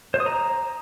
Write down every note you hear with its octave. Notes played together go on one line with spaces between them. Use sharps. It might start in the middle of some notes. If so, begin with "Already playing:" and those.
C5
D#6
A#5